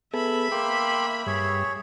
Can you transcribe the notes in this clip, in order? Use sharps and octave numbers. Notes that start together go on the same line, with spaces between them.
B3 G#4 A4 E5 B5
A#3 G5 C6 D6
G2 G#4 C#5